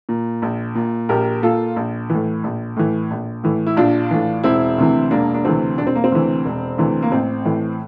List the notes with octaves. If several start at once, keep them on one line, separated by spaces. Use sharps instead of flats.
A#2
A#1
A#2
A#1 G4 A#4
A#2 F4 A4
A#1
A2 E3
A#1
A2 E3
A#1
A2 E3
E4
A#1 D4 F4
A2 E3
E1 C4 E4
D2 C3 E3
E1 A#3 D4
D4
D2 C3 E3 C4
E1 D4
C4
A#3
C4
D2 C3 E3
E1
D2 C3 E3
A#3
A1 C4
A2 E3